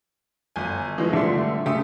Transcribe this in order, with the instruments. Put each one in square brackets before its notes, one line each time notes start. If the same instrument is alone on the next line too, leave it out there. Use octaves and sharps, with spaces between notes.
[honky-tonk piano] G1 G#5
E3 F3 G#3
[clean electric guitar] D3 G3 A3 [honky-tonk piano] E5 C6
[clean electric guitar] C#3 A3 [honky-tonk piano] G4 D#6